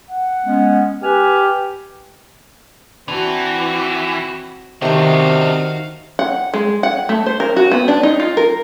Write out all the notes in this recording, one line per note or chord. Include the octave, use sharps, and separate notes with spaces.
F#5
G#3 B3 C#4
G4 B4 G#5 F6
E3 C4 D4 F#4
C3 D#3 D4 D#4 F#4 F5 C#6
F#5
G#3
F#5
A3
C5
A#4
F#4
B3
D4
D#4
F4
A#4